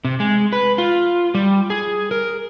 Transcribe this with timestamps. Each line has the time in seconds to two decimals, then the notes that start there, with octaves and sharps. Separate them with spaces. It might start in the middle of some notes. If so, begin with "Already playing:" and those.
0.05 C3
0.20 G#3
0.53 B4
0.78 F4
1.35 G3
1.70 G#4
2.11 A#4